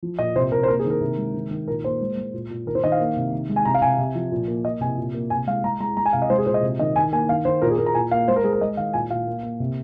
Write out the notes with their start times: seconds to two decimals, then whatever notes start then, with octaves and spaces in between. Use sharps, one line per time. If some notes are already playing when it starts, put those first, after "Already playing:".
0.03 F3
0.19 A#2 D#5
0.35 C3 C5
0.51 C3 A#4
0.63 C5
0.68 A#3 A#4
0.79 G#4
0.85 D#3
0.90 A#4
1.01 C3
1.18 G#3
1.34 D#3
1.51 D#3
1.67 A#2 A#4
1.84 A#3 C5
2.01 G#3
2.17 G#3
2.34 A#2
2.50 A#2
2.66 D#3 A#4
2.75 C5
2.83 D#3 D#5
2.92 F5
3.00 A#3
3.17 C3
3.32 D#3
3.49 G#3
3.56 G#5
3.65 C3 A#5
3.74 F5
3.82 C3 G#5
3.99 C3
4.15 F3
4.32 A#2
4.48 A#3
4.64 A#3 D#5
4.81 C3 G#5
4.97 A#2
5.14 A#3
5.30 C3 G#5
5.47 G#3 F5
5.64 G#3 A#5
5.80 G#3 A#5
5.97 G#3 A#5
6.06 G#5
6.13 C3 F5
6.22 D#5
6.30 G#3 C5
6.38 G#4
6.46 A#2 C5
6.54 D#5
6.62 C3
6.79 D#3 D#5
6.96 D#3 G#5
7.12 A#3 G#5
7.29 D#3 F5
7.45 D#3 C5
7.62 A#2 A#4
7.70 G#4
7.78 A#2 A#4
7.86 A#5
7.95 A#2 G#5
8.11 A#3 F5
8.28 G#3 C5
8.36 A#4
8.44 G#3 G#4
8.53 A#4
8.61 G#3 D#5
8.77 D#3 F5
8.93 A#2 G#5
9.10 A#2 F5
9.27 A#3
9.43 A#3
9.60 C3